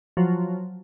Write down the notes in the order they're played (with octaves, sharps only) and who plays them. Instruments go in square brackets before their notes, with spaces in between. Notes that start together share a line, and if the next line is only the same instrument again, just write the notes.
[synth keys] F3 F#3